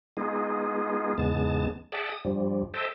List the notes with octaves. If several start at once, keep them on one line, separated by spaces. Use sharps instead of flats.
G#3 B3 D#4 F4 G#4
E2 G#2 C#3 G#3 B3 A5
G#4 D5 E5 F#5 G5 A5
D#6
G2 F3 G3
A4 C5 D#5 E5 G5 A5